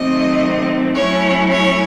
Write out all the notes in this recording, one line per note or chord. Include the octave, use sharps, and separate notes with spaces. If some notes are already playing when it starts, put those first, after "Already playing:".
Already playing: C3 D#3 F#3 A3 C4 D#5
F#3 A3 C#4 E4 C#5
C#5